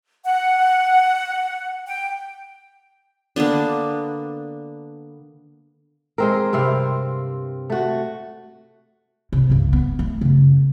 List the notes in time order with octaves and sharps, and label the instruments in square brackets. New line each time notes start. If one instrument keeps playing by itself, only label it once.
[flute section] F#5
G5
[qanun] D3 A#3 B3 D4
[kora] G#3 C4 A#4
G2 C3 C4 F5
A3 F#4
[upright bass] C3
C#2 G2
B3
A3
F#2 C#3